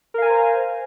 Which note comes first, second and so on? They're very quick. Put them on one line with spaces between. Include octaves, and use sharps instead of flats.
A#4 F5 G#5 A#5 C5